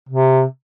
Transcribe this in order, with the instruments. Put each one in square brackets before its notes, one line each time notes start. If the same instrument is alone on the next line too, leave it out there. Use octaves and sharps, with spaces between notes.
[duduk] C3